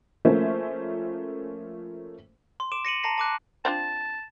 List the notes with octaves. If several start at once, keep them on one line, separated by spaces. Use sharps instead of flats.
F3 A3 A#3 C#4 C5 E5
C6
D6 D7 E7
A#6 C#7 D#7 F#7
A5 A#5 A#6 C7
A5 D6 F#6
C4 D4 F4 A5